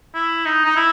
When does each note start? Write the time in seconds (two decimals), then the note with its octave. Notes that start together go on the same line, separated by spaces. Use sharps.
0.15 E4
0.46 D#4
0.65 D#4
0.77 E4